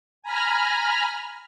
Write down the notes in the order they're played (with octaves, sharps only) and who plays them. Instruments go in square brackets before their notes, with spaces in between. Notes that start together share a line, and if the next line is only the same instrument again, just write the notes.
[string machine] G#5 A#5 B5 F6